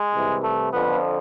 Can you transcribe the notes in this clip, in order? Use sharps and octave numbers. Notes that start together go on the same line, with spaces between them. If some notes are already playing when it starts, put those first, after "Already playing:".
Already playing: G#3
C2 C3 E3
A3
F2 D3 F3 B3